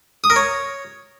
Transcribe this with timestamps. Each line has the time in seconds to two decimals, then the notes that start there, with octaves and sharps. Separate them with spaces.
0.24 D#6
0.30 A#4
0.36 C#5